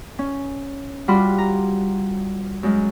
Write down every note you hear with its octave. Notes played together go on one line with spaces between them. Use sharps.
C#4
G3 F4 F#4 B5 C6 D6
A#5
F#2 G#3